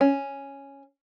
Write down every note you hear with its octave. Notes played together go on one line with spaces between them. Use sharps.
C#4